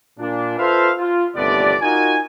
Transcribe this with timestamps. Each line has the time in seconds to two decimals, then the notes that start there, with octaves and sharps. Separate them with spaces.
0.19 A#2 D4
0.58 F4 A4 B4 C5 E5 F5
0.98 F4
1.36 G1 D#2 C3 A3 B3 D5
1.81 D#4 F4 F#4 A#4 G#5